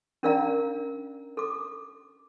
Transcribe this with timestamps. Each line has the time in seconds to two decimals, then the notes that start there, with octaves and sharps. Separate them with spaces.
0.23 C#4 D4 A#4 D5 F5 A#5
1.37 A4 D6